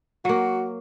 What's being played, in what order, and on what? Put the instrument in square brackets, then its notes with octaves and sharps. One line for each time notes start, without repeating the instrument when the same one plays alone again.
[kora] F#3 A#3 [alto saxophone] F#4